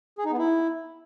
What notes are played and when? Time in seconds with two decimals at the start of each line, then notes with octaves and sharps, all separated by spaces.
0.19 G#4
0.25 D#4
0.32 B3
0.39 E4